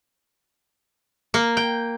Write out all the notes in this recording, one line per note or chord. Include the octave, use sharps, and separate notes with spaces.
A#3
G5